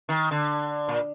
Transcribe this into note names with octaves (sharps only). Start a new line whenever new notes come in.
D#3
D3
A#2